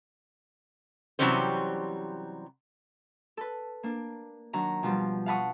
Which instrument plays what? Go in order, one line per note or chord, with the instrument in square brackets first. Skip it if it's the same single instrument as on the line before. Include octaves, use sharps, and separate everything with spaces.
[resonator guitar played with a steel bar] C3 E3 F#3 G3 C#4 C5
[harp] A4 B4
A#3 D4
D#3 F#3 D4 A#5
B2 F3 G3
F5 F#5 A5 B5 C#6 D#6